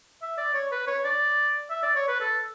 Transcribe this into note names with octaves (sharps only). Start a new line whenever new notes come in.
E5
D5
C#5
B4
C#5
D5
E5
D5
C#5
B4
A4